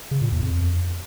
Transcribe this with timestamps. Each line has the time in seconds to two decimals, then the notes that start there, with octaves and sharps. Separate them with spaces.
0.11 C#3
0.22 A#2
0.32 E2
0.42 F2